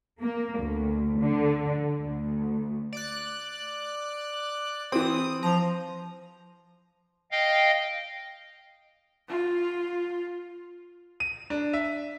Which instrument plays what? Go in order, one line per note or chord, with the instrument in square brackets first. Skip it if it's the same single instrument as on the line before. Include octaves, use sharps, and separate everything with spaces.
[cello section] A#3
D2
D3
D2
[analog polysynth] D5 F#6
[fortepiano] E3 C4 [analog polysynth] D#6
[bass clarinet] F3 [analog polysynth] A#5
[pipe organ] D#5 F5 G5
[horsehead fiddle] F4
[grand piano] D#7
D4
E5